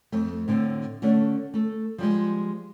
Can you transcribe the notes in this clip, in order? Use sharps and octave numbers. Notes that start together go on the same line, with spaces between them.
F2 A3
A2 D3 C4
D3 A3 C#4 D4
A3 A4
F3 G3 G#3